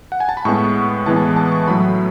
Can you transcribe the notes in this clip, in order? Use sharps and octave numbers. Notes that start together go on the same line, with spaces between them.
F#5
G#5
A5
B5
A2 G#3 B3 C#6
A2 E3 G#3 B3 A5
A5
A5
C#6
A2 F#3 A3 B5